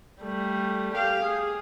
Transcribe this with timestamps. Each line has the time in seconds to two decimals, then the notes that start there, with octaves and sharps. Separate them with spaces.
0.22 G3 A3
0.94 G4 F5
1.23 G#4